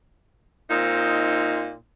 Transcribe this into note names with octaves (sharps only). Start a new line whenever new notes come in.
A#2 C4 D#4